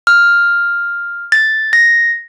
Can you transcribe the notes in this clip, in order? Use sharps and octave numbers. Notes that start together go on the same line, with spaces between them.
F6
A6
A#6